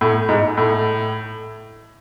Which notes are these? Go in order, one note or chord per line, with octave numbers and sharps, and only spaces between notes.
A2
G#2
A2